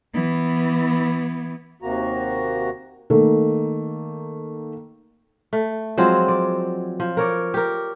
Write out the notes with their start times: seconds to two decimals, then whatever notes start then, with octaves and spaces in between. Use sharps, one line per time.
0.14 E3 B3
1.82 D#2 C3 A#3 F#4 A#5
3.10 D#3 A3 A#3
5.53 A3
5.97 F3 F#3 G#3 C4
6.28 D5
7.00 F3
7.17 A#4 C#5 D5
7.54 G4 A#4